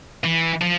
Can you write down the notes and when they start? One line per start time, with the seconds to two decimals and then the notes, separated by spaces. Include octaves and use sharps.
0.24 E3
0.62 F3